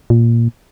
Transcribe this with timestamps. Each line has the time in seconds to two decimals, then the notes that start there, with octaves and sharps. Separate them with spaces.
0.10 A#2